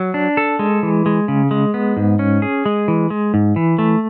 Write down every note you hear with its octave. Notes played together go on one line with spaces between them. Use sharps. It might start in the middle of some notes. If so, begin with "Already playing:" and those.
Already playing: F#3
D4
A4
G#3
E3
G#3
C#3
G#3
B3
G#2
C#4
G#4
G#3
E3
G#3
G#2
E3
A3